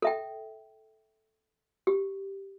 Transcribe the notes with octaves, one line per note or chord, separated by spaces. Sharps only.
A4 E5 G5
G4